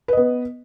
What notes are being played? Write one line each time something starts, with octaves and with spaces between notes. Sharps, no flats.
B3 B4 D#5